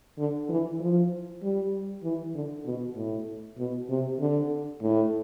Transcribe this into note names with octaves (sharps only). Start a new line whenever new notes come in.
D3
E3
F3
G3
E3
D3
B2
A2
B2
C3
D3
A2